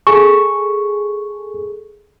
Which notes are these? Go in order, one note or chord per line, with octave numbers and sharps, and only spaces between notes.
G#4 A4 C#6